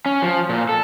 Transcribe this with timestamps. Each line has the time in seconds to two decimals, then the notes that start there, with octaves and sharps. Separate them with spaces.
0.06 C#4
0.22 F3
0.49 A#2
0.69 A4